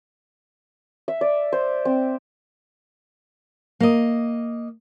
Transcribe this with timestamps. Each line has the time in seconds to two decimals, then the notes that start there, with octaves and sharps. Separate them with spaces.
1.08 E5
1.21 D5
1.52 C5
1.85 C4
3.80 A#3 D#5